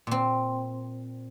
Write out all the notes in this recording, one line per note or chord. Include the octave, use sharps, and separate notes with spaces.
A#2 C4